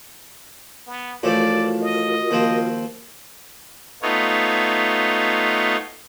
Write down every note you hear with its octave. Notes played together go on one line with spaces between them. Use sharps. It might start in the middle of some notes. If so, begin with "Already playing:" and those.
B3
A2 E3 F3 F4 F#4 A#4 D5
D#5
D#2 F3 C4
A3 B3 D#4 F4 C#5